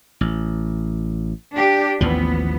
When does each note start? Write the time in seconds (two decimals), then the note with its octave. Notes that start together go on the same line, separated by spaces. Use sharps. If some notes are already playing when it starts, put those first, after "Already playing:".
0.21 A1
1.53 D4 G4
2.01 A1 D#2 F3 B3